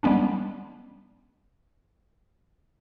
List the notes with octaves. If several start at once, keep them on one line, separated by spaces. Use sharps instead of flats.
G3 G#3 B3 C#4 D4